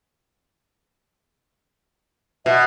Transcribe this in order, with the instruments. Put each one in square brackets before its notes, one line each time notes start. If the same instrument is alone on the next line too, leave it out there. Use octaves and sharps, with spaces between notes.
[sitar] B2 [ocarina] E5